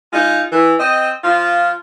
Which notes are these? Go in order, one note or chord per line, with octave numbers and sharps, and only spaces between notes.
G#3 D#4 F4
E3
C4 D#5
F3 F4